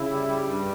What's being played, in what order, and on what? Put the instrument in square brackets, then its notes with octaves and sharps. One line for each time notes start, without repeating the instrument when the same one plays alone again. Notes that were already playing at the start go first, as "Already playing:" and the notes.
Already playing: [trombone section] C#3 [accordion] E4
[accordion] G3
G3
G2